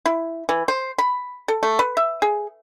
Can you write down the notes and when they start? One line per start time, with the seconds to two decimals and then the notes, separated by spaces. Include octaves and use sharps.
0.06 E4
0.49 E3
0.68 C5
0.98 B5
1.48 A4
1.63 A3
1.79 B4
1.97 E5
2.22 G#4